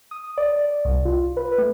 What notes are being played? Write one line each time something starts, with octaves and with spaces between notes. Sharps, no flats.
D#6
D5
D5
C2
F4
B4
A3